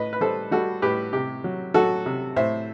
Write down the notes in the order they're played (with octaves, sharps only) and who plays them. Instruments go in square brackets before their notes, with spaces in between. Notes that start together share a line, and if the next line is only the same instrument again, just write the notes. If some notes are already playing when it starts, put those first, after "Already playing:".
Already playing: [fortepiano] A2 B4 D#5
B4
G3 A4 C5
G3 F#4 A4
A2 G4 B4
C3 G4
F#3
F#3 F#4 A4
C3
A2 C5 E5